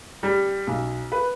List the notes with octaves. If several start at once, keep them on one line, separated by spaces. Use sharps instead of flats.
G3
B1
B4